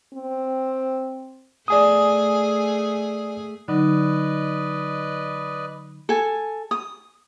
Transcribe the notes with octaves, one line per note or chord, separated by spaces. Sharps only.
C4
A3 G#4 D5 G#5 D#6
D3 F#3 D#4 B4 D5 D#5
A4 G#5
D#6